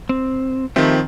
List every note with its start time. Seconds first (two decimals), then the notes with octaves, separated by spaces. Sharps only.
0.09 C4
0.76 D#3 F3 A3 C4 G4 E5